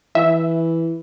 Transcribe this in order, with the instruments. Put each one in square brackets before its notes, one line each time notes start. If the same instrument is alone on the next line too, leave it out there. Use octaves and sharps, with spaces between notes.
[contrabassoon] E3 [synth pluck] E5